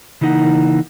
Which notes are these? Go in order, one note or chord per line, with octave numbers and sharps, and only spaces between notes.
C#3 E3 A#3 D#4 F#5